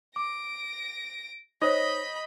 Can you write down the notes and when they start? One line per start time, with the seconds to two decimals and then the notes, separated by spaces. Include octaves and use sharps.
0.16 D6 A#6 D7
1.61 D#4 C5 C#5 D#5 B5 G6